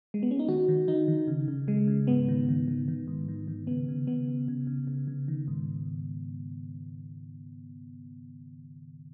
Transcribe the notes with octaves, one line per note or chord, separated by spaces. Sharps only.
G#3
B3
C#4
D#4
D#3 F#4
D#3
D#3 D#4
D#3
C#3
C#3
C#3 G#3
C#3
G#2 B3
D#3
D#3
D#3
D#3
G#2
D#3
D#3
C#3 B3
C#3
C#3 B3
C#3
C#3
C#3
C#3
C#3
D#3
G#2